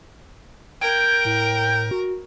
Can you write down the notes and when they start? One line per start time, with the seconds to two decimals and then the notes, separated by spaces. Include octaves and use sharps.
0.81 A#4 G5 G#6
1.25 A2
1.91 F#4